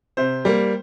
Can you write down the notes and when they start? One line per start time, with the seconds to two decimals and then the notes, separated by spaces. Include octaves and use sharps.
0.17 C3 C5
0.45 G3 A#3